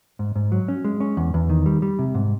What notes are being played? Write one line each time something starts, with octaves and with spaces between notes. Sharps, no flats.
G#2
G#2
F#3
C#4
G#3
C#4
E2
E2
D#3
G3
G3
C3
G#2